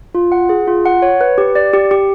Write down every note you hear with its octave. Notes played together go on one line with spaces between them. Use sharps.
F4
F#5
G#4
F4
F#5
C#5
B4
G4
D5
G4
G4